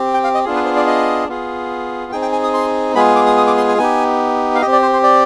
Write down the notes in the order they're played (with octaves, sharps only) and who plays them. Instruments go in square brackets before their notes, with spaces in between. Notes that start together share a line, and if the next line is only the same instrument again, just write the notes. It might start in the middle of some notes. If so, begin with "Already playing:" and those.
Already playing: [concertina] C4 G4
G5
F5
D#5
B3 D4 F4 G#4
B4
C5
D5
D#5
B3 F4 G#4
C4 D#4 G#4 G5
G5
G#5
D#6
C6
G#3 B3 F4 G#4 B5
D6
D#6
D#6
D6
C6
G#5
B3 D#4 G4 G#5
F5
G4 D#5
C4
D5
C5
C5
D5